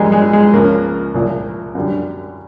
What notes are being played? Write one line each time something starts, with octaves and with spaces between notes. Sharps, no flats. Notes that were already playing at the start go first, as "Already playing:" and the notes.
Already playing: A#1 A#2 G3 G#3
G#3
G#3
C#2 C#3 F3 A#3
C2 A#2 F3
F#2 D3 G3